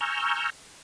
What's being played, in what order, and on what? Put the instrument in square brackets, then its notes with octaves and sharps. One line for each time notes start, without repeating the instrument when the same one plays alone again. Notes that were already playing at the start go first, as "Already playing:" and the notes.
[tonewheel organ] G#5 A#5 C#6 E6 F6 G6